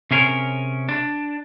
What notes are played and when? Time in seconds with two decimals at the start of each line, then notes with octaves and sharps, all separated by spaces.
0.11 C3 C#4 G#4 A#4
0.89 D4